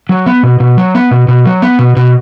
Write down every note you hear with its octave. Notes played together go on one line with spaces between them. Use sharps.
F#3
B3
B2
B2
F#3
B3
B2
B2
F#3
B3
B2
B2